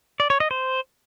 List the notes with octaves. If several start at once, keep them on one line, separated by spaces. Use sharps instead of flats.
D5
C#5
D#5
C5